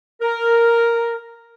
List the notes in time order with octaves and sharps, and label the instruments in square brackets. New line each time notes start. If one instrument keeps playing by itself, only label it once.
[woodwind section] A#4